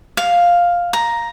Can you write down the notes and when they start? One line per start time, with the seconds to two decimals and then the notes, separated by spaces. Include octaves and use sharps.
0.17 F5
0.93 A#5